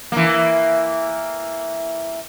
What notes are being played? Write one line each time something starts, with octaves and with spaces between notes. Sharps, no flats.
E3 A#3